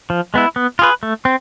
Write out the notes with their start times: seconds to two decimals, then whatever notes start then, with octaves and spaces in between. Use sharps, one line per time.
0.10 F3
0.34 G#3 B3 E4
0.56 B3
0.79 F4 G#4 B4
1.03 A3
1.25 C4